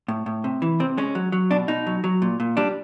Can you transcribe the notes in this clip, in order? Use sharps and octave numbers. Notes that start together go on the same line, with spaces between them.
A2
A2
C3
E3
C3 C4
G#3 C#4
F#3
F#3
B2 D4
B2 D#4
F#3
F#3
A#2
A#2
G3 D4